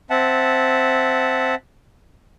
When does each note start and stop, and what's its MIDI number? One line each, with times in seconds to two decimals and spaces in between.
0.10 1.55 60
0.10 1.55 76
0.10 1.55 78
0.10 1.55 81